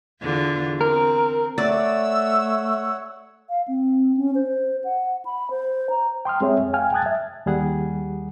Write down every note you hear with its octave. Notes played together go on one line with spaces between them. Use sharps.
E2 D3 F4
C4 A#4
A3 C#5 D5 F#5 E6
F5
C4
C#4
C5
F#5
B5
C5
A#5
G5 C6 D#6 F6
G#3 C4 G#4 C#5 E5
F2
F5 G5 G#5 F6
G5 A5 D#6 F#6 G#6 A6
E5
D#2 G3 G#4 F#5